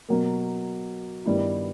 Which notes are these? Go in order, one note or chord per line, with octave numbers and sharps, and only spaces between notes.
B2 F#3 A#3
G2 D#3 G3 B3 E4